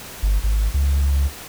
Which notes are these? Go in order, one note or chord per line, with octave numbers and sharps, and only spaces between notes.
G1
G#1
C#2